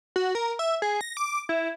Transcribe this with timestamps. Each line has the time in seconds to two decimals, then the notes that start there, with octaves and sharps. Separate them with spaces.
0.16 F#4
0.35 A#4
0.59 E5
0.82 G#4
1.01 A#6
1.17 D6
1.49 E4